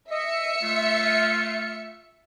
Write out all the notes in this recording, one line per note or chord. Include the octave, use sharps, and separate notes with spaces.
D#5 E5 C#7
A3 F4